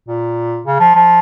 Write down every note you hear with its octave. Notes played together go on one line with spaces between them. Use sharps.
A#2
C#3
F3
F3